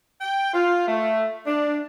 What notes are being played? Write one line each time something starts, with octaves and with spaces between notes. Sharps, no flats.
G5
F4
A3
D4